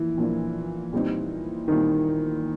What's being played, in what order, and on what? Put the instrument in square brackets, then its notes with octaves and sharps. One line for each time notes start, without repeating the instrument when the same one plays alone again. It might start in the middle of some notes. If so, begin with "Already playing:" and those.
Already playing: [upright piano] A#2 F3 A#3 [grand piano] E3
[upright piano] A#2 F3 A#3 D4
A#2 G3 C4 D#4
[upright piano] A#2 G3 C4 D#4 [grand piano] D#3